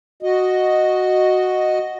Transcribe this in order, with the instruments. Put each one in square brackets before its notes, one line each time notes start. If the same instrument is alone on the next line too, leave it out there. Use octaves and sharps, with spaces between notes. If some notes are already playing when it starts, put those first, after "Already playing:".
[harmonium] F#4 D#5